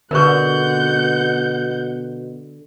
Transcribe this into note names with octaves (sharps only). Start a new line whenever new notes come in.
B2 D3 A#4 B4 F#5 C#6 G6